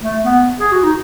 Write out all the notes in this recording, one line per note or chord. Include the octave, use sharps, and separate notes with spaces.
A3
B3
G#4
F#4
D#4